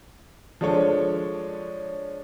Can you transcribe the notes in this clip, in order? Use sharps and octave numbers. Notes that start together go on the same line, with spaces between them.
F3 G#3 D4 A4 C#5